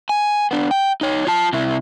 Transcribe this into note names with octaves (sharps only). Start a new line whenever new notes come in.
G#5
B3 D4
G5
D#4 C#5
F4 A5
C3 E4